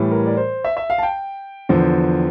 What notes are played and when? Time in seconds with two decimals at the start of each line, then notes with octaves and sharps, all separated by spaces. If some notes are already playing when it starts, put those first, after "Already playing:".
Already playing: A2 E3 G3
0.11 A#4
0.26 D5
0.37 C5
0.64 E5
0.77 E5
0.90 F5
0.98 A5
1.03 G5
1.69 E2 D3 F3